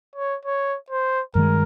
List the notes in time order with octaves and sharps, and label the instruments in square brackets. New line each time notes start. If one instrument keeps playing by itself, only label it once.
[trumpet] C#5
C#5
C5
[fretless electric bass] G2 D#3 G#3 [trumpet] A#4